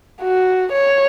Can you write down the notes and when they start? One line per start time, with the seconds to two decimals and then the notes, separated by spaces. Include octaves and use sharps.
0.22 F#4
0.72 C#5